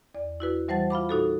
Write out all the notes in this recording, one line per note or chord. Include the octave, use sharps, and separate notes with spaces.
E2 D5
E4 F#4 B4
E3 G3 C5 F#5 A5 A6
F4 F5 B5 D6
A#2 D#4 F#4 A4